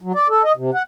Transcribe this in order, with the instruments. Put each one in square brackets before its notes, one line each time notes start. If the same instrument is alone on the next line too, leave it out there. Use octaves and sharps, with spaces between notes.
[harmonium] F#3
D5
A4
D#5
C3
F#5